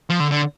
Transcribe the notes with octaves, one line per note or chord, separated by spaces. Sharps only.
F3
D3
D3